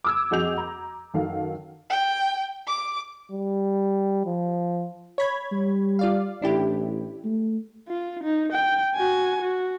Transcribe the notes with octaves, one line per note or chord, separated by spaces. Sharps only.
D6 E6 G#6
F2 F#4 G#4 D#5 G6 F7
A#5
F#2 D#3 A4 F5 F#5
G5
D6
G3
F3
C#5 B5 G#6
G3
F4 D5 F5
A1 D4 E4 G4
A3
F4
D#4
G5
F#4 G#5
F#4